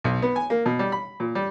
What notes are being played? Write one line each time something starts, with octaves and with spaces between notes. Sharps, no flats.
B1
B3
G#5
A#3
B2
G3
B5
A#2
G3